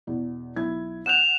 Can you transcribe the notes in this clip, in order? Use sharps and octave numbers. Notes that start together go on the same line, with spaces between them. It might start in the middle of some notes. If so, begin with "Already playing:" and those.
E2 B2
B1 E4 G#6
F#5 F#6 G6 E7 F7